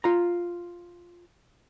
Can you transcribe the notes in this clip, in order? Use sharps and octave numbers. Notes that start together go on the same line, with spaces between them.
F4 A#5